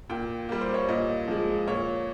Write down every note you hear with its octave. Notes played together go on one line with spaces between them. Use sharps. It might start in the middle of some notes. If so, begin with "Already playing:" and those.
A#2 G5
G3 A#3
C5
C#5
A#2 D#5
F3 G#3
A#2 C#5